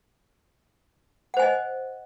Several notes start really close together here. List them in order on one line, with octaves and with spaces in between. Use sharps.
F#5 C5 G#5 D#5